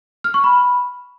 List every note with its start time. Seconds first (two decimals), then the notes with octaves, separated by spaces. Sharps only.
0.24 F6
0.34 C#6
0.44 B5